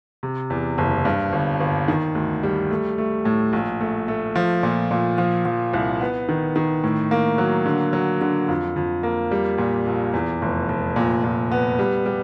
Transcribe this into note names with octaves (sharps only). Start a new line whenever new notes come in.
C3
E2
F#1
G2
G1
G1
D#3
D2
G3
A3
A3
A2
A#1
A3
A3
F3
A#2
A#2
F3
F3
C2
B3
D#3
D#3
A2
A#3
F#3
D3
F#3
D3
F2
F2
A#3
G3
A#2
A#1
E2
F1
F1
A#2
A#2
B3
G3
G3